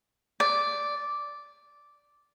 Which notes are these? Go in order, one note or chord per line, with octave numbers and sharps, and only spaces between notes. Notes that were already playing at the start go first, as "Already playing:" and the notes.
D5